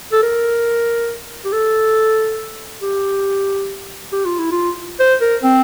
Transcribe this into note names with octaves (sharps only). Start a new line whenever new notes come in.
A4
A#4
G4
A4
G4
G4
F4
E4
F4
C5
A#4
C4